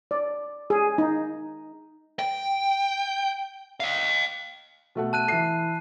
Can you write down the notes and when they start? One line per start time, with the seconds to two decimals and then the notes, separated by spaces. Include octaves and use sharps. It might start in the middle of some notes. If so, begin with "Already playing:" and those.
0.11 D5
0.70 G#4
0.98 D#4
2.19 G5
3.80 D#5 F5
4.95 B2 A3 F#5
5.13 A5 F#6 D#7
5.28 E3 E5 C7